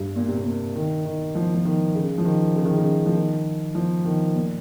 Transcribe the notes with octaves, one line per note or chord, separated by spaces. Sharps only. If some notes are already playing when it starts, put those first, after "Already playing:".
Already playing: G2
A#2
C3
A#2
D#3
D#3
F3
F3
D#3
C#3
F3
D#3
C#3
D#3
C#3
F3
D#3
F3
D#3
A#2